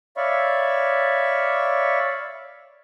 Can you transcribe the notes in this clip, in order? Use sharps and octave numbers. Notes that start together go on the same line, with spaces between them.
C#5 D5 E5 F5 B5 C#6